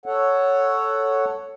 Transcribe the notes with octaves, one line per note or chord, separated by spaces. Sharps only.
A4 C#5 F#5